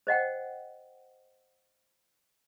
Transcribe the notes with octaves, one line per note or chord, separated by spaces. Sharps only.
C5 D#5 F#5 G5